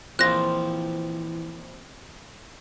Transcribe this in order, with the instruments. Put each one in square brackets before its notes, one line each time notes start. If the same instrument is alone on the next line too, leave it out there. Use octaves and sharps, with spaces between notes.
[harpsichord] A#1 F3 [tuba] E3 [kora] C4 F4 [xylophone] F#6 A#6